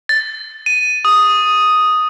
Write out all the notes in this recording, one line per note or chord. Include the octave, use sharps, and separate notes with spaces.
A6
D#7
D#6